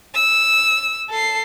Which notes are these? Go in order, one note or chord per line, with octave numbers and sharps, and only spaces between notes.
E6
A4 C7